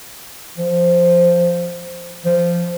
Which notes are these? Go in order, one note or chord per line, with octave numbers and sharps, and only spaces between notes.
F3
F3